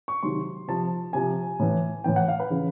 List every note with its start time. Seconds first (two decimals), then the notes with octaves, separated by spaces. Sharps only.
0.08 C#6
0.23 C3 D#3 F#3 C6
0.68 C3 F3 A5
1.13 C3 F3 G#5
1.59 A2 E3
2.04 A2 E3 G5
2.16 F#5
2.28 F5
2.40 B4
2.50 C#3 E3